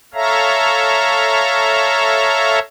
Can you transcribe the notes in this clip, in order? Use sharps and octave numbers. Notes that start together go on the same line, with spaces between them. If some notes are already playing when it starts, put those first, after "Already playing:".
A4 C#5 E5 F5 A#5